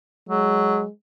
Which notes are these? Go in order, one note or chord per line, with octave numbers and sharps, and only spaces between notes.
F#3 G#3